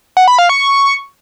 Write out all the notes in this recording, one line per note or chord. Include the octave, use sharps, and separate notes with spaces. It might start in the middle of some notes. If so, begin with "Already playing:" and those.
F#5
B5
F5
C#6